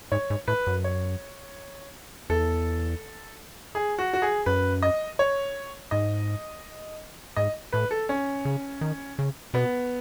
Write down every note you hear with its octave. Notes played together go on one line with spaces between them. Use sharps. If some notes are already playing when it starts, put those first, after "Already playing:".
G#2 C#5
G#2
A2 B4
F#2
C#5
E2 A4
G#4
F#4
F#4
G#4
F#2 B4
D#5
C#5
G#2 D#5
G#2 D#5
A2 B4
A4
C#4
C#3
D#3
C#3
B2 B3